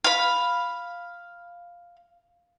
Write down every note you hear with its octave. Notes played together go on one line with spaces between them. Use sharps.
F5 B5